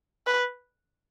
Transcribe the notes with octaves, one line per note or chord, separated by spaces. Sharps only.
B4